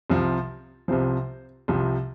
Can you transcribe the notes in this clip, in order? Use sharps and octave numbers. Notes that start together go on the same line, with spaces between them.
C2 C3 F3
C2 C3 F3 C5
C2 C3 F3